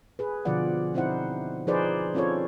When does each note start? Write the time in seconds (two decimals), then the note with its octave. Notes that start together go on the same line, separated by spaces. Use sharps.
0.19 G#4 B4
0.45 B2 D3 F3 F4 D5 F#5
0.94 C4 D#4 E4 C5 F#5
1.67 F3 D#4 G#4 B4 C5 D5
2.14 C4 C#4 F4 A4 C#5